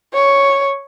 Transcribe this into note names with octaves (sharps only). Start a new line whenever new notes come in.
C#5